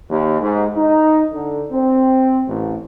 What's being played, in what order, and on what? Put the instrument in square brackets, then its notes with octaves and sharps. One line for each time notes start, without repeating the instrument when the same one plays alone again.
[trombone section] D#2
G#2
D#4
D3
C4
A1